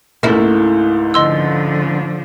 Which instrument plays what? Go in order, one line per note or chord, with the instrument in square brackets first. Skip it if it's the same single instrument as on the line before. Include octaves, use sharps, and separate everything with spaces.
[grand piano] C#2 G#2 A3 [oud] A#3 E4
[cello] D3 F3 [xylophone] D#5 C6 E6